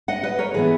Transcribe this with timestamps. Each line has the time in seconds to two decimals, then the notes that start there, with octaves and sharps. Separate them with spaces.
0.08 D#5 F#5
0.23 B4 D#5
0.39 A#4 C#5
0.54 E3 B3 G#4 B4